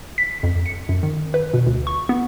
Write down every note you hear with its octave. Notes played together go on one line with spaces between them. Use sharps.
B6
F2
C#7
F#2
D#3
B4
B2
D2
C#6
B3